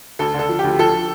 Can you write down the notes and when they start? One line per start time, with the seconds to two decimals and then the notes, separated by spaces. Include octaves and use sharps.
0.19 D2 A4
0.34 D3
0.39 A4
0.49 F3
0.59 G4
0.64 D2
0.79 F3 A4